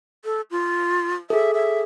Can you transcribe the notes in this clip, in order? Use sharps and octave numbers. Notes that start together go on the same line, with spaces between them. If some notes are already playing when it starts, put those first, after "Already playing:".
A4
F4
G#4 A4 E5
E5